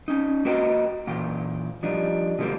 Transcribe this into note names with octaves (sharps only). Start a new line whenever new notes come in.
C#4 D#4
A#3 F#4 B4 D#5 G5
A#2 E3 G5
F3 G3 D4 D#4
B2 D3 G3 G#3 A#3